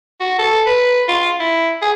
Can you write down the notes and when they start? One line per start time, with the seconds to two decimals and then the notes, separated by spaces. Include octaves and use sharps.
0.20 F#4
0.38 A4
0.66 B4
1.08 F4
1.40 E4
1.82 G#4